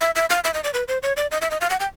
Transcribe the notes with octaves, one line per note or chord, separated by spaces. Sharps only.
E5
E5
F5
E5
D#5
D5
B4
C5
C#5
D5
D#5
E5
D#5
F5
F#5
G5